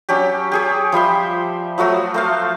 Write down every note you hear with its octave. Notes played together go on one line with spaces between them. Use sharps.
F#3 C#4 D4 G4
G4 G#4 C#5
F3 G3 E5 C6
F3 F#3 A3 F#4
A3 C5 F5